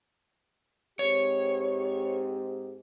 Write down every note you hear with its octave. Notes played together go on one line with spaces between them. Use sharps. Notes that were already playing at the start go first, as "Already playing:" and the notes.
G#2 C4 G4 C#5